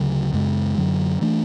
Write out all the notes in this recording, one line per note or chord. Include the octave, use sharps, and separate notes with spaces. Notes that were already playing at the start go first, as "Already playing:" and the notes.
Already playing: D2 C#3 F#3
F#2 C#3 G#3
F#2 D3 F#3
E3 A3 D4